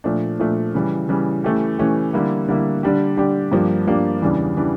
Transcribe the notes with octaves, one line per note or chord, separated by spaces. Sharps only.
A#2 F3 A3 D4
A#2 F3 A3 D4
C#3 E3 G3
C#3 E3 G3
E3 A3 C#4 G4
E3 A3 C#4 G4
D3 G3 A#3 E4
D3 G3 A#3 E4
D3 G3 D4 G4
D3 G3 D4 G4
G2 F3 A#3 D4 G4
G2 F3 A#3 D4 G4
E2 C#3 E3 G3 D4
C#3 E3 G3 D4